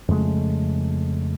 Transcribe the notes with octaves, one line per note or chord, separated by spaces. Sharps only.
F2 C#3 G#3 A3